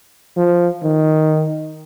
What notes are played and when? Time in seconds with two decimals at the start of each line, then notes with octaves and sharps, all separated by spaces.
0.37 F3
0.83 D#3